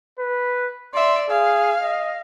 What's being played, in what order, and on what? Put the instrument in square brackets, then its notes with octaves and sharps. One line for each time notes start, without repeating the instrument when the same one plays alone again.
[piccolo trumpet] B4
[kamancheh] D5 E5 [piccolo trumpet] C6
[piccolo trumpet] G#4 [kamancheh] F5
[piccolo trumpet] D#5